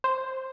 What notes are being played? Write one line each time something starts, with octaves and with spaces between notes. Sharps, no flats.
C5